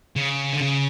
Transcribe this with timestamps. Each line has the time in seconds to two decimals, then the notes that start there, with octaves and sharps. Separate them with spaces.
0.16 C#3
0.53 D3
0.61 C#3